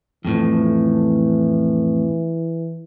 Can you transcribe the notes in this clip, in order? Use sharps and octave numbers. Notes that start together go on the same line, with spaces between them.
F2 A2 E3